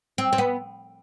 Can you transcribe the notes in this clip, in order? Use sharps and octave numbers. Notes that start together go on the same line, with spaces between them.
C4
C4
B3